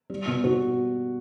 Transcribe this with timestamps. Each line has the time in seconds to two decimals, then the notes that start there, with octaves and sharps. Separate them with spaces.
0.10 G3
0.27 B2
0.44 B2 F#4